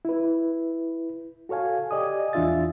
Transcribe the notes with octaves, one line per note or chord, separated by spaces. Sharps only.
E4 B4
F#4 A4 C#5 F5 G#5
G4 D5 D#5 G#5 D#6
E2 E3 D4 F4 E5 A6